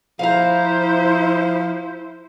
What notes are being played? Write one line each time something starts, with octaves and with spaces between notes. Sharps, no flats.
F3 E4 C5 F5 A#5